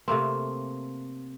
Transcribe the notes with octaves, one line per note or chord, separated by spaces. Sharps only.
C3 A3 A#3 C4